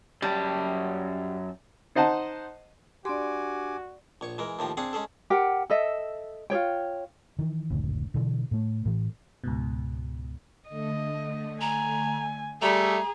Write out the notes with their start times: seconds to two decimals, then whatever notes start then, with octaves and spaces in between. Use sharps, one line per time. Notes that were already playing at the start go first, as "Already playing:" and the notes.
0.22 F#2 G3 A5
1.95 D#4 C5 D#5 F#5 A5
3.05 D4 F#4 G4 D5 G#5 C6 D6
4.21 A#1 C#5 C#6
4.38 E3 G#3 A#4
4.59 D#2 A2 F3 G4 A#5
4.77 C4 D4 G#4 F5 F#5 G#5
4.93 G#3 C#4 G#4 A4
5.30 G4 A#4 F#5
5.70 A4 D#5 E5
6.50 F4 G#4 C#5 G5
7.39 D#3 E3
7.70 F1 C#2 A2 D3
8.14 B2 D3 E3
8.51 A2 A3
8.86 A2 E3
9.44 C#2 G#2 B2
10.69 D3 A3 D#5
11.61 G#5 A#5
12.62 G3 A3 G#4 A#5